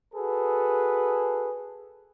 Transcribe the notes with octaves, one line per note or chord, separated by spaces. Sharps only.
F#4 G#4 A4 B4